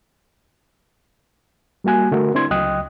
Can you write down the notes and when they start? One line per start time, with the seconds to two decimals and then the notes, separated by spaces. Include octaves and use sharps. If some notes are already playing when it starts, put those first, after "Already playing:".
1.84 G3 A#3 F#4 G#5 F#6
2.12 D3 A3 F#4 A#4
2.34 C4 D4 E4 C6 G#6
2.51 C#2 F#3 D#5 G5 D#6 F#6